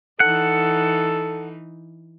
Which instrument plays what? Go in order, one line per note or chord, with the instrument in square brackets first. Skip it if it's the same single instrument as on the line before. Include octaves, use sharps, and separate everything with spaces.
[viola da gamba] E3 D#4 [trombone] A4 [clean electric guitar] F#5